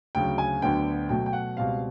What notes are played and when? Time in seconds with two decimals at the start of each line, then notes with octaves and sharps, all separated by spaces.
0.15 D2 C#3 F#3 G5
0.38 G#5
0.62 D2 D3 F#3 B3 G5
1.09 B2 F#3 A3 G5
1.26 G5
1.33 F#5
1.57 C#2 B2 G3 C4 F5